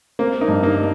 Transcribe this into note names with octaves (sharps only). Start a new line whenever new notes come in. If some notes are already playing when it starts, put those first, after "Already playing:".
A#3 C4
A#3 D#4
G2
A#3 D#4